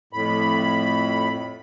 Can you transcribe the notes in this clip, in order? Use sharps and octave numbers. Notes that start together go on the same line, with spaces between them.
F2 A2 B5